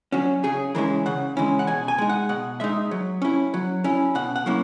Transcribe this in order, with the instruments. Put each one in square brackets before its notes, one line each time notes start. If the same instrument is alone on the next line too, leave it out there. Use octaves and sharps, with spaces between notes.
[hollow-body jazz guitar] F#3 C#4 F#4
C#3 G#4
E3 G#3 C#4 E4 A#4
C#3 F#5
E3 G#3 C#4 E4
F#5
B2 G#5
G#5
G#3 D#4
F#5
B2 F#5
G#3 D#4 E5
F#3
C#4 E4
F#3
C#4 E4
B2 F#5
F#5
F#3 A#3 C#4 E4